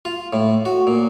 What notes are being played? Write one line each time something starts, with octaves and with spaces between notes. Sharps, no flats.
F4
A2
F#4
A#2